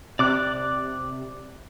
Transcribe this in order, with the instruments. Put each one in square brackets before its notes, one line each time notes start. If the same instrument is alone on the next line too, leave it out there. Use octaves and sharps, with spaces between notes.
[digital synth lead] C3 [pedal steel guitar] D5 D6 F#6